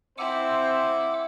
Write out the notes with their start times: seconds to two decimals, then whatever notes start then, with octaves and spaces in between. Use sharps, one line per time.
0.18 C4 E4 C5 F#5 D6 E6